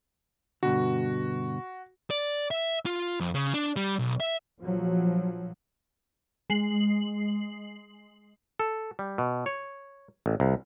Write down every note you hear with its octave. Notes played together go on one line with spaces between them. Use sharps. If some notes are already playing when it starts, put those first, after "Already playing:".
G2 B2 D3 F#4
D5
E5
F4
F2
C#3
D4
G3
B1
E5
A#1 F3 F#3
G#3 C7 F#7
A4
G3
B2
C#5
A1
C2